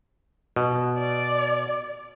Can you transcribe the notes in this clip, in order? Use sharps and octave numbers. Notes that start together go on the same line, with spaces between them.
B2
D5